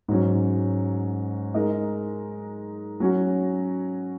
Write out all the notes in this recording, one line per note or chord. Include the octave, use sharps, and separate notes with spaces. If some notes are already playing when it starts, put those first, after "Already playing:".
G#2 F#3 C#4
G#3 D#4 A#4 D#5
F#3 C#4 F#4